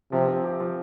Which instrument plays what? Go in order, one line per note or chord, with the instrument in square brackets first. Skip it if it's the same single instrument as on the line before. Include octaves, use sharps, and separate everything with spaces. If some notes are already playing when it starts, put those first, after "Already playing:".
[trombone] C3 [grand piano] F3
[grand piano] C4
G4
F3